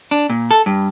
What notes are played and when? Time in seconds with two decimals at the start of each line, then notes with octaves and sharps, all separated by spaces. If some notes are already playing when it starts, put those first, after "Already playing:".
0.11 D4
0.30 A#2
0.51 A4
0.66 G2